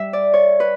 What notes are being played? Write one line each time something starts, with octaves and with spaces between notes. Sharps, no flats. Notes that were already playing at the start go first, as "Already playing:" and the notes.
Already playing: G3 E5
D5
C#5
B4